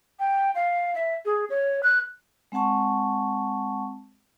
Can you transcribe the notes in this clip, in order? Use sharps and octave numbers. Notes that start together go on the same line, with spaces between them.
G5
F5
E5
G#4
C#5
F#6
G#3 C4 F#5 A5 C#6